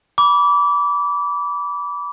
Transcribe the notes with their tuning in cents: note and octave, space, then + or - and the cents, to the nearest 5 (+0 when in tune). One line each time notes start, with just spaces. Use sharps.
B5 -15 D6 -25